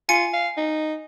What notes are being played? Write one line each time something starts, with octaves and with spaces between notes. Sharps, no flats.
F4 G#5 C#7
F5
D#4